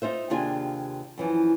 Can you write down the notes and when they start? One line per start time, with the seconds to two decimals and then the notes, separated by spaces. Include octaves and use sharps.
0.02 D#4 F4 C5 E5
0.30 D#2 C3 D4 F4 G#4 G#5
1.18 F#2 E3 F3